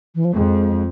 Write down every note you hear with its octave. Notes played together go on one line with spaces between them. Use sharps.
E3
F3
F2 G#3